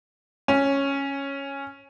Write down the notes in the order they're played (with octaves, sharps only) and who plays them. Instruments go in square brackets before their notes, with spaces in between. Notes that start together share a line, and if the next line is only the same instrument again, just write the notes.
[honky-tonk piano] C#4